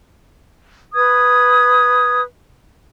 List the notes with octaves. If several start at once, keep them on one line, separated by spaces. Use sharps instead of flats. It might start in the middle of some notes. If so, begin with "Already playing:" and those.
B4 D#6 G#6